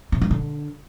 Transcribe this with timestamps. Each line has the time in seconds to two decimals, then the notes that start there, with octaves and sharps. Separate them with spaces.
0.12 C3
0.22 G2
0.31 D3